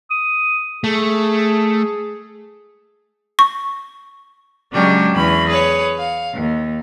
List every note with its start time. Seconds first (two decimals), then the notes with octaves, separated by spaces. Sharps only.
0.10 D#6
0.84 A3 G#4
3.39 C#6
4.73 C#3 F#3 G#3 C#4 D4 G4
5.14 E2 C#4 B5
5.47 G#4 B4 C#5
5.98 F5
6.33 D#2